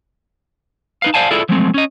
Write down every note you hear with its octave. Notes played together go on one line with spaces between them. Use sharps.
D#4 B4 F5
C5 D5 F5 G#5 A5
E4 F4 G#4 A4 D5
F3 F#3 G#3 A3 C4
C#4 D#5